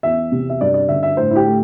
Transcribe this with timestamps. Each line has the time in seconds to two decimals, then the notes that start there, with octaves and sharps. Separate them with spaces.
0.03 E2 E5
0.32 C3
0.50 E5
0.61 G2 D5
0.74 D5
0.88 D3 E5
1.03 E5
1.17 A2 C5
1.31 E4
1.36 G4
1.46 A3